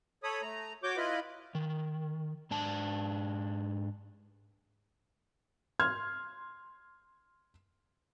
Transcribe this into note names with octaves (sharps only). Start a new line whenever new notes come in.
A4 C#5 B5 D#6
A3 A#5
F#4 C#5 D6 G6
E4 F4 B4 D#5 B5
D#3
G#2 D4 A5
C6 F6 G#6